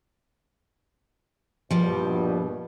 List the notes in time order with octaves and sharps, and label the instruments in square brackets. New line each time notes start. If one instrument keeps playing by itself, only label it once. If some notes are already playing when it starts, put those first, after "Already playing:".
[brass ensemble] A#1 G2 B2 [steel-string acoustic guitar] F3 G3